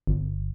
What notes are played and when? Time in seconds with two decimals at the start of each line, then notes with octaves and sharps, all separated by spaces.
0.07 G1